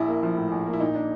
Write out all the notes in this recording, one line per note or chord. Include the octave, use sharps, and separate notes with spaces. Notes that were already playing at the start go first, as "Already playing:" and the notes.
Already playing: A#1 E4
A#3
F3
A2
A#1
A#3
E4
A#2 D#4
D4